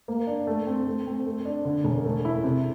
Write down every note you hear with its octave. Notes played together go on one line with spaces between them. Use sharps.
A#3
D4
A3
C4
A3
C4
A3
D4
D3
E1
A3
E4
C3